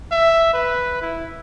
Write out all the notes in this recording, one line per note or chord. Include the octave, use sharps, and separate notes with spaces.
E5
B4
E4